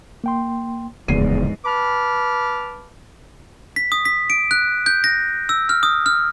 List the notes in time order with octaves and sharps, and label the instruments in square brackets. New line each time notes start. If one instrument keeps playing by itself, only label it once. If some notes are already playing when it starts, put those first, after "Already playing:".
[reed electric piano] A#3 G5 C6
[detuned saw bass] D1 [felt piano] E2 C7 D#7 [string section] G#2 F3 [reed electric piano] C#3
[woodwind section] B4 A5 B5 D6 F6
[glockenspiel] B6
D#6
B6
D7
F#6
G6
A#6
E6
F6
D#6
F6